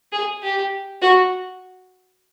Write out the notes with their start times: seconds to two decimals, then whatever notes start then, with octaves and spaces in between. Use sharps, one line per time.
0.12 G#4
0.43 G4
1.02 F#4